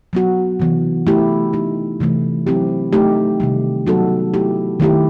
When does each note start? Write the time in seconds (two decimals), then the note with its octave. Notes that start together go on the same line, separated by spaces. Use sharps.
0.13 F#3 B3 F#4
0.60 C3 E3 B3
1.07 A3 E4 G4
1.53 A3 D#4 G4
2.00 C3 E3 A3
2.47 F#3 C4 E4 G4
2.93 A3 D#4 G4
3.40 C3 D#3 G3
3.87 F#3 B3 D#4 F#4 A4
4.34 A3 E4 G4
4.80 D#3 A3 E4 G4